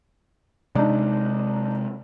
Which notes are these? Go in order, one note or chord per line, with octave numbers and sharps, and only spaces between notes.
C3 G#3 D4 D#4 D5